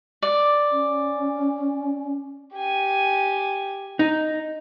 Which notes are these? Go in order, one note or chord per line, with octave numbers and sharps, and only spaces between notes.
D5
C#4
G4 G#5
D#4